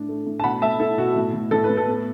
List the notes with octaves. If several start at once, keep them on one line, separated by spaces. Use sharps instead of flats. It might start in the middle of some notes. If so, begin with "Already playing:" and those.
Already playing: A2 D4
A3
A2
A5
B2 F#5 B5
A3 E5 A5
E4 A4
B2 F#4
A2
A2
A2 A4
B4
A2
A4
B3